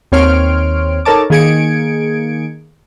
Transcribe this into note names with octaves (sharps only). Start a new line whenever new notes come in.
D#2 C4 C#5 C6 F6 D7
D#4 A4 A#4 C#5 A5 D6
D#3 A#3 G#4 G#6 C#7 D7